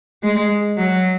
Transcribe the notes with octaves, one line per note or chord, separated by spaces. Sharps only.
G#3
F#3